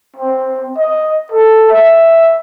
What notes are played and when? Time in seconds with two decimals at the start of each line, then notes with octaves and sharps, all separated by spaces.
0.16 C4
0.77 D#5
1.32 A4
1.70 E5